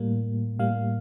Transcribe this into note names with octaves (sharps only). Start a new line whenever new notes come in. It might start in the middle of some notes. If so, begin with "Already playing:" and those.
Already playing: A2 G3 A#3
A2 G3 A#3 F5